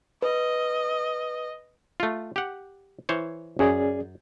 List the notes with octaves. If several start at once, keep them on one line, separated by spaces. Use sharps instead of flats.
B4 D#5
A3 F4
G4 F#5
E3 C5 C#5
F#2 C#4 G#4 D5